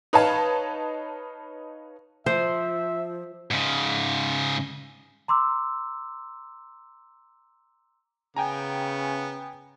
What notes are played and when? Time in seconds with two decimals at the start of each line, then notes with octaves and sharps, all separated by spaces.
0.13 D#4 B4 C#5 F5 A5
2.26 F3 C5 E5
3.51 G#2 C#3
5.28 A#5 C6 D6 E6
8.36 C#3 B3 G5 G#5 A#5